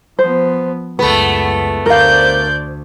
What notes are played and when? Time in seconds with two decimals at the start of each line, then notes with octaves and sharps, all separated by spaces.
0.19 F3 B3 C5
0.99 C#2 F#2 A3 B3 B4
1.86 D2 A#4 C5 D5 F5 G6